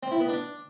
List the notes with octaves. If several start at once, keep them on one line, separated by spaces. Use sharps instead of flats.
C4
E4
B3
D4